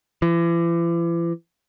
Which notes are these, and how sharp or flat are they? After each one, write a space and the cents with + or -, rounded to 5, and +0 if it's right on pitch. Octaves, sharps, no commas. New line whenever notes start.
E3 +40